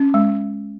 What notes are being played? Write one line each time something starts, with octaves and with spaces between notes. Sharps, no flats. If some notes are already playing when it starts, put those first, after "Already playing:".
Already playing: C#4
G#3